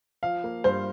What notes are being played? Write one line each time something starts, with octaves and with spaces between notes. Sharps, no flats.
F3 F5
A#3
G2 C5